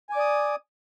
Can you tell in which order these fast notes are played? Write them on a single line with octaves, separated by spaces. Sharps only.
G#5 D6 D5 D#6